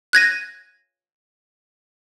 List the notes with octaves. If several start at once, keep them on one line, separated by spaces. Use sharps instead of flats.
F#6 G#6 A#6 D#7